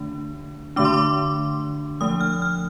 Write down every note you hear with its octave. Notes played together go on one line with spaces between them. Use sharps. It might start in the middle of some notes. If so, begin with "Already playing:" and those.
Already playing: D3 A3 D4
D3 A3 D4 D6
C6
D6
F3 A3 D4 D#6
F6
F6